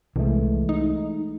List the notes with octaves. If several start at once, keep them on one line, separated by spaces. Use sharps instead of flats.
C2 E3 G#3 A3
D#4